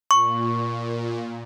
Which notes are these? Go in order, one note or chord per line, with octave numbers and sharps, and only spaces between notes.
A#2 C#6